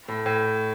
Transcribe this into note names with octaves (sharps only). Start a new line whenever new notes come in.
A2
A2